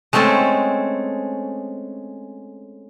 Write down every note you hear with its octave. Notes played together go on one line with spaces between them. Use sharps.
G#3 A3 C4 C#4 A4